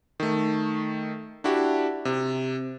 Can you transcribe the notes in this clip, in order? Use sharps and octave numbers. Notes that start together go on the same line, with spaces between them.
D#3 A3
D4 E4 F#4 G4
C3